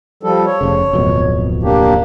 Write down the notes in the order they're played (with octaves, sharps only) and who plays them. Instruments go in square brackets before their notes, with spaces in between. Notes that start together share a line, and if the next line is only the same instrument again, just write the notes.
[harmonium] F3 G3 A4
C#5
[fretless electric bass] F1 C#3
D1 F2 B2
[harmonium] A#3 D4 G4